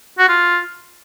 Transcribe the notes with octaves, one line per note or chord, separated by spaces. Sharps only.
F#4
F4